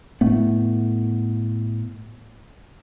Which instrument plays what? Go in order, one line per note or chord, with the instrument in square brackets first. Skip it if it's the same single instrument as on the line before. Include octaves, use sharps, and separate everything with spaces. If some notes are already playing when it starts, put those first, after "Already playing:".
[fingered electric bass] A2 A3 B3